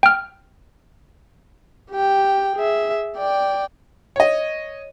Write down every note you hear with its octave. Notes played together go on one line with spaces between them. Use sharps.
G5 F6
G4 G5
G#4 E5
D5 G5
C#5 D#5